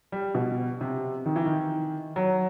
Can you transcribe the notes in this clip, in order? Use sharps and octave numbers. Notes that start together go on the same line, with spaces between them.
G3
B2
C3
D#3
E3
D#3
F#3